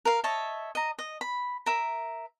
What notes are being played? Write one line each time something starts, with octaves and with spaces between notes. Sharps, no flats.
A#4 F5
C#5 D#5 E5 A5
D#5 A#5
D#5
B5
A#4 E5